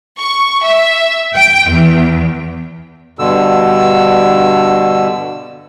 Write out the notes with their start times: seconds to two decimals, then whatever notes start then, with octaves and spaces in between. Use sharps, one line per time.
0.19 C#6
0.64 E5
1.34 G5
1.70 E2
3.19 G2 B2 D3 E6